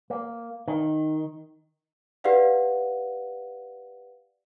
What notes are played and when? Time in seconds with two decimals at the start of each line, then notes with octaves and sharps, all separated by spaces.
0.10 A#3
0.68 D#3
2.24 G4 B4 D5 F5 F#5